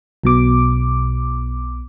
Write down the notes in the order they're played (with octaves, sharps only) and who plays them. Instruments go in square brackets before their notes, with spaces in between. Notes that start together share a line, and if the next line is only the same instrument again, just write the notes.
[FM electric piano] B1 B2 D6